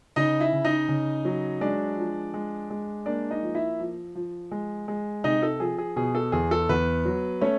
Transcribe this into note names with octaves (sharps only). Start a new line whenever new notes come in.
C#3 D#4 D#5
E4 E5
C#3
D#4 D#5
C#3
F#3
G#3 D4 D5
F3
G#3
G#3
A#3 D4 D5
D#4 D#5
F3
E4 E5
F3
F3
G#3
G#3
C3 D#4 D#5
A4
F3 G#4
G#4
B2 G#4
A4
E2 G#4
A4
E2 B3 B4
F#3
A3 C#4 C#5